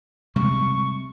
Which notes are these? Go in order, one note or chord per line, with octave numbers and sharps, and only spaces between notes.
C3 G3 G#3 C#6